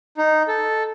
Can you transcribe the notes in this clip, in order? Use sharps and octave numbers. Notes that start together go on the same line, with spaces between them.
D#4
A4